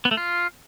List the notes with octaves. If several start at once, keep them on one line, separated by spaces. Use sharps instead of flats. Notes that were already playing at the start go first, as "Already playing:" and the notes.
B3
A3
F4